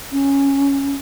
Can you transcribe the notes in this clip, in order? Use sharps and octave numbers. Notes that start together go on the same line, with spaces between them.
C#4